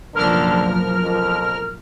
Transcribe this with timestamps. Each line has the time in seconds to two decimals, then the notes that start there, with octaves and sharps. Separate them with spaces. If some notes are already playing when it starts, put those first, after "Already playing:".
0.14 F#1 B2 D3 F3 A#4 F6
1.03 F2